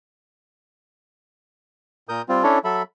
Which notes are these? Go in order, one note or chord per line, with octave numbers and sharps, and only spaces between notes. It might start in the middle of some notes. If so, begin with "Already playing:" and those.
A#2 A#4 D#6 G6
G3 C4 F4
C#4 D4 E4 A4 C#5
F#3 A4 E5 B5